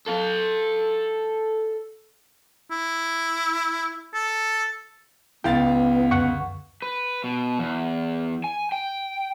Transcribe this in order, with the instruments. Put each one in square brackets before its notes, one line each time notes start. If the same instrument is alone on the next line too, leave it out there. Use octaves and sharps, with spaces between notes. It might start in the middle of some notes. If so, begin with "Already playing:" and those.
[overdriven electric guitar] A4 F5
[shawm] E4
A4
[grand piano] C#2 F5 A6 [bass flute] B3 [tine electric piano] E4 [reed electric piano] G5
[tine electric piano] F#2 D3 [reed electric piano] F#5 C#6
[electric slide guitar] B4
B2
E2
G#5
G5